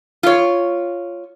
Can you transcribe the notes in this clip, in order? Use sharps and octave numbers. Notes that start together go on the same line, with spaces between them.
F4 C#5